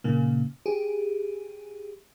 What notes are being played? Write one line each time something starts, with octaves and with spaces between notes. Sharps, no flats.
A#2 C#3 A#3
G4 G#4